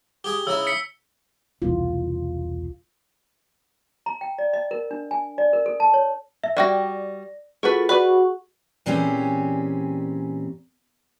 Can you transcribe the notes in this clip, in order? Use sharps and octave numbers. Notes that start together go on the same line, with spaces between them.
G4 G#4 D#6 G7
C#3 D#4 E4 E6
B6 C#7
E1 C2 F4
A#5
G5
D5
D#5
A#4
D4
G#5
D5
A#4
A4
A5
C#5
E5
G3 F#4 D5 G5 A#6
A3 F4 F#4 G#4 A4 B4
F#4 B4 D5 F#5 B5 C#6
A#2 E3 C4 C#4 G4 G#4